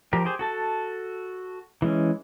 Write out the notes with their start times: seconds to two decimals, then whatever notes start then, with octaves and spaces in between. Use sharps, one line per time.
0.13 F3 G4 A#4
0.25 G4 G#4 C5
0.39 F#4 A4 A5
1.82 E3 G#3 C#4